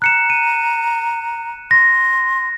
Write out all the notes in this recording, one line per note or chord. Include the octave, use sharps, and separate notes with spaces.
A#5 F#6 C#7 E7
D#7
C6 A#6